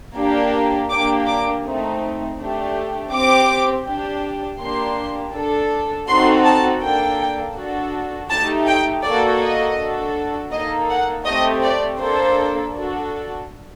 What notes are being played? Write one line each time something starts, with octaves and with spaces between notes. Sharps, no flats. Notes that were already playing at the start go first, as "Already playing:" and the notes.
A#3 D4 G4
A#3 D4 G4 D6
D6
A3 C4 D#4
A3 D4 G4
C4 G4 D6
D4 G4
A#3 D4 G4 C6
D4 A4
C4 D#4 F#4 A4 C6
A5
A#3 D4 A4 G5
D4 F#4 A4
A3 D#4 G4 A5
G5
A#3 F#4 A4 D5
D#5
D4 F#4 A4
A#3 D#4 A4 D#5
F#5
A3 C4 G4 D#5
D5
A#3 D4 A4 C5
D4 F#4 A4